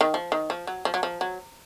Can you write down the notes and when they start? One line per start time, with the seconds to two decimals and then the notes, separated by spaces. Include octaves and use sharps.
0.01 D#3
0.14 F3
0.32 D#3
0.50 F3
0.67 F#3
0.85 F3
0.94 F#3
1.03 F3
1.21 F#3